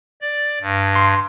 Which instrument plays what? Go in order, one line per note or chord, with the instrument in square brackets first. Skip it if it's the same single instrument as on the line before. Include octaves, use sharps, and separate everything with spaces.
[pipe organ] D5
G2
[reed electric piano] C6